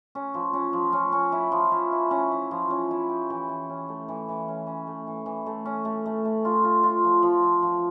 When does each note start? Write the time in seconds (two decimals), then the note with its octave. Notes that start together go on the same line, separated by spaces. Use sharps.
0.15 C#4
0.34 F3
0.53 C#4
0.73 F3
0.93 C#4
1.12 C#4
1.32 E4
1.52 F3
1.71 E4
1.92 E4
2.11 C#4
2.32 E4
2.51 F3
2.70 C#4
2.91 E4
3.09 G4
3.30 E3
3.49 E3
3.69 C#4
3.88 A3
4.08 E3
4.28 E3
4.48 C#4
4.67 C#4
4.87 A3
5.07 E3
5.26 E3
5.46 A3
5.65 C#4
5.85 A3
6.06 A3
6.25 A3
6.45 F4
6.64 F4
6.83 F4
7.04 F3
7.22 F3
7.43 F3
7.62 F3